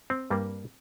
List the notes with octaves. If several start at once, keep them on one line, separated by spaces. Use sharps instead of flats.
C4
G2 G3 A#3